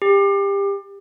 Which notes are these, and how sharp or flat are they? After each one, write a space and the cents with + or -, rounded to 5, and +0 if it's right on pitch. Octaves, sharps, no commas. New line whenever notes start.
G4 +25